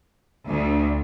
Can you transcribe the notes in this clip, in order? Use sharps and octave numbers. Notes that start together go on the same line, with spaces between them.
D2